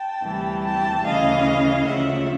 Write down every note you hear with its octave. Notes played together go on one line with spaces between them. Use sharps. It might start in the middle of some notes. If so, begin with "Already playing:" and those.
Already playing: G5 A5
D2 C3 E3 G3
G5 A5
D2 C#3 E3 D#5 F5
D2 C#3 F3 E5 F#5